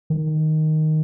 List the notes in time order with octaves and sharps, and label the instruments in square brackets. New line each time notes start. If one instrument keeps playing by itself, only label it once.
[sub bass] D#3